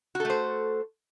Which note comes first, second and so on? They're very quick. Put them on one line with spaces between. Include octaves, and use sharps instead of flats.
F#4 A4 A3 C5